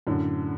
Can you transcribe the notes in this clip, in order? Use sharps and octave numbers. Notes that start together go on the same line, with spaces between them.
F#2 A2 D3